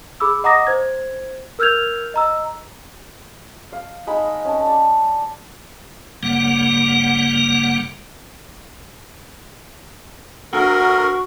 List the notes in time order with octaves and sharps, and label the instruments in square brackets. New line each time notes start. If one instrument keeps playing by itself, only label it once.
[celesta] G#4 B5 D6 E6
D#5 F#5 A#5 D6 D#6 A#6
C5 G#6
A#4 E6 F6 G6 G#6 F7
D#5 A#5 E6
[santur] F5
G#3 D#4 D#5 B5
C#4 A5
D5
[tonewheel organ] F#1 G2 C#3 G3 A#3 F#5
[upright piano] D2 [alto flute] F#4 [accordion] A#4 [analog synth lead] C#6